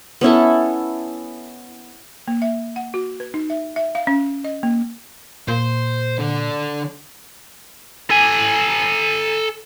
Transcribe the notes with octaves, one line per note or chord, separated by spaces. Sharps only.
B3 C#4 E4 A4
A#3
E5
F#5
F#4
B4
D#4
E5
E5
F5
C#4
D#5
A#3
A#2 C5
D3
A4 G#5